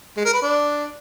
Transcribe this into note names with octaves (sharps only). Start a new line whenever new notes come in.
G#3
A#4
B4
D4